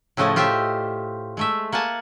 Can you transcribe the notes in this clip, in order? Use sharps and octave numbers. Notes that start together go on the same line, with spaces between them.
A2 C#3 F3 A3 D#5
F4 G4 C5 D#5 E5
G#3 A3 E5
A#3 F#5 G#5 A5